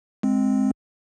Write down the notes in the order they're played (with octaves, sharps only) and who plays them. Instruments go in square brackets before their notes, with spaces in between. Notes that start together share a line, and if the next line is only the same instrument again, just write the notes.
[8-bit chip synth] G#3 C4